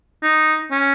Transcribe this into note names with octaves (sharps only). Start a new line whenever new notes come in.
D#4
C#4